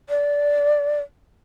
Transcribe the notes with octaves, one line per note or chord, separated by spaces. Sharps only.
D5